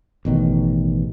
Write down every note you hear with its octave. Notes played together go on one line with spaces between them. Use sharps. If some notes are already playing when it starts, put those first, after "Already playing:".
A1 B2 D#3